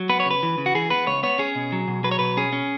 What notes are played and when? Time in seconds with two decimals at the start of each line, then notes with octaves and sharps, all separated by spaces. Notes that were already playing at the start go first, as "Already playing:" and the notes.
Already playing: F#3
0.09 B3 B4
0.20 C#5
0.25 C#3
0.31 B4
0.43 E3
0.58 C#3
0.66 F#4
0.75 E3 G#4
0.90 B3 B4
1.07 C#2 C#5
1.23 B3 C#5
1.39 C#4 G#4
1.55 B2
1.72 F#3
1.88 B2
2.04 F#3 B4
2.11 C#5
2.19 B2 B4
2.37 C#4 G#4
2.53 C#4